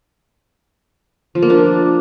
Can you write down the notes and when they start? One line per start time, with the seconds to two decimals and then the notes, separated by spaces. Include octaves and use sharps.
1.35 F3
1.42 A#3
1.50 D4